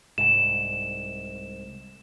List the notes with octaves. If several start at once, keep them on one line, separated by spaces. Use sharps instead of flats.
C2 G#2 E7